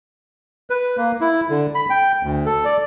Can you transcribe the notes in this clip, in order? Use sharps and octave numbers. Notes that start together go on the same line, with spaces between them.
B4
A#3
E4
D3
B5
G5
D2
A4
D5